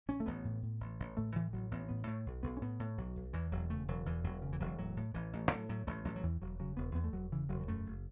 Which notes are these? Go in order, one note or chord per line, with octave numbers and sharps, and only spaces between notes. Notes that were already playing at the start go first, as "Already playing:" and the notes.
A1 C#4
A3
A1 B3
A2
A2
A1
A1
A2 A3
A2 E3
A1 F#3
A1 B3
A2 B3
A2 A3
B1
B1 B3
C#4
A2 B3
A2
B1 F#3
B1
E2 E3
E1 F#3
C#3 A3
E1 F#3
E2 E3
E1 F#3
C#3
E3
E1 F#3
A2 F#3
A2
A1 E3
A1
A2 F#3
A2 F#3
A1 A3
A1 F#3
F#3
E2 E3
E1 F#3
C#3 F#3
E1 B3
E2 B3
A3
E1 F#3
C#3 E3
E1 F#3
F#3
F#2 A3
F#1